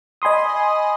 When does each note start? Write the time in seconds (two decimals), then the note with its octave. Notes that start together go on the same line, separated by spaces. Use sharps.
0.22 D#5 G#5 B5 C6 D#6